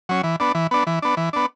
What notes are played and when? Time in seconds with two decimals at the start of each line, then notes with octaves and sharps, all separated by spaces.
0.09 F#3 C#4
0.24 E3
0.40 B3 D4
0.55 E3
0.71 B3 D4
0.87 E3
1.02 B3 D4
1.17 E3
1.33 B3 D4